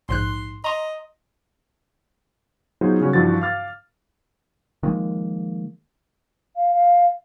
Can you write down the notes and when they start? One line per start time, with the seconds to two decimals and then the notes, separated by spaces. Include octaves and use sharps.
0.09 A#1 G#2 C6 F#6
0.64 D#5 A#5 C6
2.81 F#3 B3 D#4 F4 G#4 C5
3.01 C#3 G3 C#4 F#4
3.13 G2 E3 F3 F#4 A6
3.41 F5 D6 F6 A6
4.83 D#3 F3 G#3 A#3
6.56 F5
6.74 F5